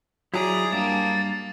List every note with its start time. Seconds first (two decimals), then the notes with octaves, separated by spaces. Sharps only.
0.34 F#3 E4 G#4 D5 A#5
0.72 G2 A#3 A5